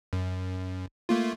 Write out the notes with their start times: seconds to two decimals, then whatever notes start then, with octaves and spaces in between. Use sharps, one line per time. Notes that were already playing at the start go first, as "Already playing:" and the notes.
0.13 F#2
1.09 A3 A#3 F4